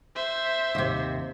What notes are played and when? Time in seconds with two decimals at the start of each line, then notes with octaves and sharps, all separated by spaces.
0.15 C5 E5
0.75 D#2 C3